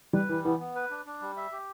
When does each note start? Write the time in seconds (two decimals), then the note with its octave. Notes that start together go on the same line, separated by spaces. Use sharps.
0.13 G3 B4
0.29 E3 G3
0.45 E3 B3
0.60 B3
0.75 B4
0.91 D4
1.06 D4
1.21 G3
1.37 E5
1.52 G4